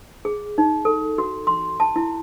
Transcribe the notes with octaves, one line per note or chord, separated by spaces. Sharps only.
G#4
D#4
A4
F#4
C6
A5
E4